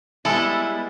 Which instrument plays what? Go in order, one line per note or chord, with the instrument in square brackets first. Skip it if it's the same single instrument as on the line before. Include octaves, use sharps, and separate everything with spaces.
[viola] G3 B3 [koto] G#3 A4 [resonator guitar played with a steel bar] E4